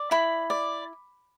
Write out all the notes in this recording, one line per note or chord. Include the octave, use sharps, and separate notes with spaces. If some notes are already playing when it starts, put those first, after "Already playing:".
Already playing: D5
E4 B5
D5